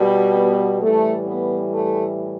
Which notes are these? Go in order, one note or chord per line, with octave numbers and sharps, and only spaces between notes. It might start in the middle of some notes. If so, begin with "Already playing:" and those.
Already playing: B2 G3
B3
A2 E3 G3 A3
B3
A3